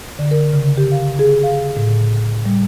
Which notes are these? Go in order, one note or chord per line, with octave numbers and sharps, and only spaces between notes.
D3
A#4
C#3
G4
F5
G#4
F5
A2
G3